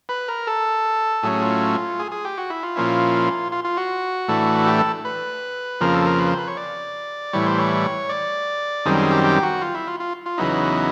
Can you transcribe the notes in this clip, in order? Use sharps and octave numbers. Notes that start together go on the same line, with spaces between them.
B4
A#4
A4
A2 F#3 A3 C#4 G#4
F4
G#4
G#4
G4
F#4
E4
F4
A#2 F3 A#3 C#4 E4
F4
F4
F#4
A2 E3 A3 D4
G4
A4
B4
F2 C#3 F3 A#3 A#4
A4
A#4
B4
C5
B4
C#5
D5
A2 E3 G3 C#5
C5
C#5
D5
F#2 D#3 G3 C4 G#4
G#4
G4
G4
F#4
F4
E4
F4
F4
F4
E2 C#3 F#3 B3 D#4 E4